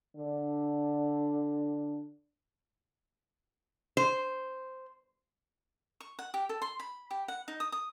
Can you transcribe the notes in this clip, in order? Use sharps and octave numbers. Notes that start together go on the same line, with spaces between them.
D3 D4
C5
C#6
F#5
G4
A4
C6
B5
G4
F#5
D#4
D#6
D#6